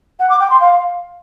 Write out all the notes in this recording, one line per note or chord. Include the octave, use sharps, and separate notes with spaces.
F#5
D6
G5
C6
F5